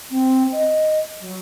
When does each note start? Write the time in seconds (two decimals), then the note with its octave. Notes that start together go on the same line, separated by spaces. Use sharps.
0.10 C4
0.52 D#5
1.20 F#3